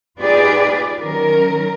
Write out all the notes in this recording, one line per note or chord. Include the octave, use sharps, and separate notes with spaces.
D#4 F4 G4 G#4 B4 D5
D#3 F#3 C#4 A#4